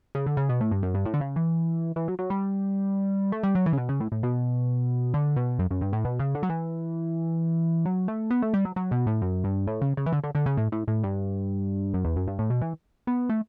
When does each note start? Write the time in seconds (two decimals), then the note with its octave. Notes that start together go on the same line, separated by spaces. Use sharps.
0.15 C#3
0.26 D3
0.37 C#3
0.49 B2
0.60 A2
0.71 G2
0.83 F#2
0.94 G2
1.05 A2
1.14 D3
1.21 C#3
1.36 E3
1.96 E3
2.08 F#3
2.19 F#3
2.30 G3
3.32 A3
3.43 G3
3.55 F#3
3.66 E3
3.73 C#3
3.78 B2
3.89 C#3
4.00 A2
4.12 A2
4.23 B2
5.14 D3
5.36 B2
5.59 F#2
5.71 F#2
5.81 G2
5.93 A2
6.05 B2
6.19 C#3
6.35 D3
6.43 F#3
6.50 E3
7.85 F#3
8.08 A3
8.30 B3
8.42 A3
8.54 G3
8.65 F#3
8.76 F#3
8.91 B2
9.06 A2
9.22 F#2
9.44 G2
9.67 A2
9.81 C#3
9.97 C#3
10.06 E3
10.12 D3
10.24 D3
10.35 D3
10.46 C#3
10.57 A2
10.72 A2
10.88 A2
11.03 G2
11.94 F#2
12.05 E2
12.16 F#2
12.28 G2
12.39 A2
12.50 B2
12.61 E3
13.07 B3
13.29 A3